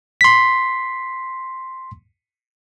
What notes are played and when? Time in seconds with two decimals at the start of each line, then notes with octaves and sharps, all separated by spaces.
0.21 C6 B6